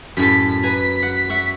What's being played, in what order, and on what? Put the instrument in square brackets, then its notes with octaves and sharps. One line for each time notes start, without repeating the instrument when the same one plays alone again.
[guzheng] F#2 A2 A4 [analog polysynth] B6
[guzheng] B4 G#5 A#5
F#5
F#4 E5 F#5